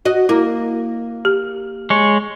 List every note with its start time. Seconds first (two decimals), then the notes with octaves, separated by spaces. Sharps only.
0.05 F#4 D#5
0.29 A#3 E4
1.25 G4
1.90 G#3 C#5